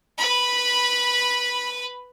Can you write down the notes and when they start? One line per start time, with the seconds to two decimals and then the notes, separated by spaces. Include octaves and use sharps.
0.18 B4 B5